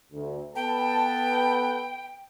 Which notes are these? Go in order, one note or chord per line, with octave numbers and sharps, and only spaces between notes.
D2
B3 A4 B4 G5 A5